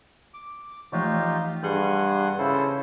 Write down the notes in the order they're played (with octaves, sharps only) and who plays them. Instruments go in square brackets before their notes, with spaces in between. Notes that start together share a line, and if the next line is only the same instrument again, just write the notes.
[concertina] D6
[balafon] E3 F3 A3 [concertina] D#4 F4 G4
[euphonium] G2 [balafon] G#4 [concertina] F#5 G#5 C6
[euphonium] C#3 [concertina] E4 A4 C5